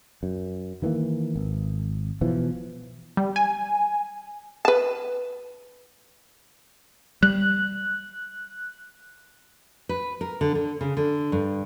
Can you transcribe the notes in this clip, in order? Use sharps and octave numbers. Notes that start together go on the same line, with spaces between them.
F#2
D#3 E3 G#3 A#3
G#1
B2 E3 F3
G3
G#5
B4 A5
G3 F#6
B4
A#4
D3
D3
C#3
D3
G2